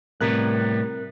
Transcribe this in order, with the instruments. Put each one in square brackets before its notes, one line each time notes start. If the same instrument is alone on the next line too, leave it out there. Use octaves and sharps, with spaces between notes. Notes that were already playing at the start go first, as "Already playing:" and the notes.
[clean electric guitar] A2 G3 B3 [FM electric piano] C3 A#4 F#6